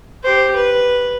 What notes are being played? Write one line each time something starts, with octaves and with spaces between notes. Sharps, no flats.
G4 C5
B4